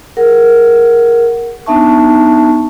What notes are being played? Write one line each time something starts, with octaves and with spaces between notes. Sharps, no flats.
G#4 A#4 F#5
B3 D4 D#4 E5 A5 C#6